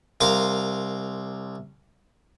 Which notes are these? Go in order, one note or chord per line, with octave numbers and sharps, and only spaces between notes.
C2 A#4 F5 C6